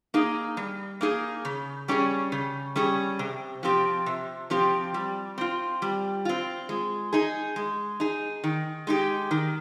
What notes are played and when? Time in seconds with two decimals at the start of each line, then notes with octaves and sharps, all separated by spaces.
0.14 A#3 D#4 G#4
0.57 G3
1.01 A#3 D#4 G#4
1.45 C#3
1.88 G3 C#4 G#4
2.32 C#3
2.75 G3 C#4 G#4
3.19 C3
3.63 F3 C4 G4
4.06 C3
4.50 F3 C4 G4
4.94 G3
5.38 C4 F4
5.82 G3
6.25 C4 F4
6.69 G#3
7.13 D#4 G#4
7.56 G#3
8.00 D#4 G#4
8.44 D#3
8.87 G#3 D#4 G4
9.31 D#3